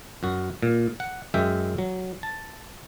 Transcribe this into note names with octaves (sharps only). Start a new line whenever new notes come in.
F#2 F#4
A#2
F#5
F#2 G#3 E5 G5
F#3
A5